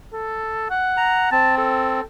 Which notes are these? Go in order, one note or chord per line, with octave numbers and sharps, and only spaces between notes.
A4
F#5
A#5
C4 A5
A4